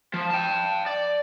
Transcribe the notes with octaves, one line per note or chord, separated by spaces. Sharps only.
F3
G5 A5
D5